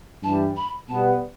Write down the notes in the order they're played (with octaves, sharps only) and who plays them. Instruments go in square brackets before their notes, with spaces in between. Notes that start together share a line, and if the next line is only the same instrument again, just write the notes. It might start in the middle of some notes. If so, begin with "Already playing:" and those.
[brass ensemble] G2 E3 G3 [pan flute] A5
[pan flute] B5
[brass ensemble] B2 G3 B3 [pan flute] A5